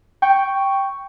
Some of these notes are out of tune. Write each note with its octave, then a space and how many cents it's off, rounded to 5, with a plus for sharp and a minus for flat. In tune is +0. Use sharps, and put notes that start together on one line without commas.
G5 +0 C#6 +0